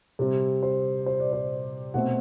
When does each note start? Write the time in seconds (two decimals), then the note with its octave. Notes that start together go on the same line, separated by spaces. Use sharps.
0.19 C3 G3 C4
0.63 C5
1.06 C5
1.20 D5
1.33 C5
1.94 B2 A3 C4 F#5